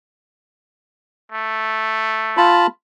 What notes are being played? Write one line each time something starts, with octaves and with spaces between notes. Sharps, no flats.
A3
F4 A5 B5